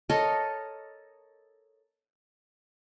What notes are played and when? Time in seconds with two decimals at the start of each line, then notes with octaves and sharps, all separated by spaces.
0.09 A4 A#4 C#5 D#5